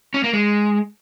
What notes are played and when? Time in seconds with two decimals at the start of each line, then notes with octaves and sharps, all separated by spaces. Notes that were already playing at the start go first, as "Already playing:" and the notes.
0.14 C#4
0.24 A#3
0.33 G#3